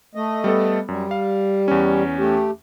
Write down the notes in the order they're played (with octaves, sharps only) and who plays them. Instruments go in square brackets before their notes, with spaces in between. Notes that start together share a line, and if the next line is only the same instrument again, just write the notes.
[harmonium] A3 D#5
[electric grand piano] G3 B3 A4
[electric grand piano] F#2 [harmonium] G3
[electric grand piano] F5
E2 C#4
[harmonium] A3 G4